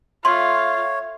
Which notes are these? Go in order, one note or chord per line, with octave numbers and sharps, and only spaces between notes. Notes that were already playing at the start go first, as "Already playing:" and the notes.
A3 F4 C#5 C6